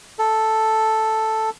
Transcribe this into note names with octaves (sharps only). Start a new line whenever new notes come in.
A4